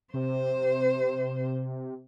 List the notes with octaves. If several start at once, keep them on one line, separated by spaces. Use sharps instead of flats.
C3 C5